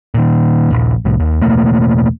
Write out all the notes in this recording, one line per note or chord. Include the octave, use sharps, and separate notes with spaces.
A#2 D#3
D#1 A#1
C2 A2
D#2
E2 B2 A3 A#3